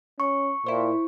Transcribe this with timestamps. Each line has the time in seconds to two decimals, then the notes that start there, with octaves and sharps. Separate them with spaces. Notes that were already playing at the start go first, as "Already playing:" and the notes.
0.20 C#4 C#6
0.66 A#2 E4 C5